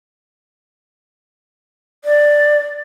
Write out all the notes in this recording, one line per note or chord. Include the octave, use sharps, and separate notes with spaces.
D5